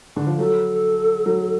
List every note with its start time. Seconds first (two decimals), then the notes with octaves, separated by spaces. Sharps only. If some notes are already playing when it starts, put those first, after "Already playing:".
0.16 D3
0.27 F3
0.38 F#3 A4
1.26 F#3